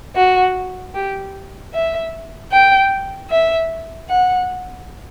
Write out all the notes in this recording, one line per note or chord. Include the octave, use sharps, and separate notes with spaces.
F#4
G4
E5
G5
E5
F#5